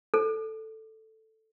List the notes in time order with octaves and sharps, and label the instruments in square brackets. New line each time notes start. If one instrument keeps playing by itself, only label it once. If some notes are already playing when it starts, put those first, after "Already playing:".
[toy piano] A4